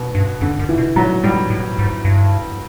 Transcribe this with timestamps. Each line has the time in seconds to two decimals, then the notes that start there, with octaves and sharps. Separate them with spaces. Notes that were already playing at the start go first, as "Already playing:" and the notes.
Already playing: B2
0.15 G2
0.41 F2 D3
0.59 F#2
0.69 E3
0.78 B2
0.96 A#2 F#3
1.23 A2 G3
1.50 A2
1.79 G#2
2.05 G2